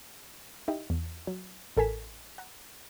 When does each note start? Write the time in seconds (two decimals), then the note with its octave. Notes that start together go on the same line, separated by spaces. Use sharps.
0.68 D#4 E4 G4 D#5
0.90 E2
1.27 F#3
1.77 A1 A4 A#4 G#5 B6 E7
2.38 F#5 A#5